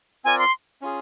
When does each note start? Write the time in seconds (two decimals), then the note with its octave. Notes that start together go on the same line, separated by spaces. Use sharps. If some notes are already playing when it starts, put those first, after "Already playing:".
0.24 C4 F4 A#4 D5 G#5
0.39 C6
0.82 C#4 F4 G#4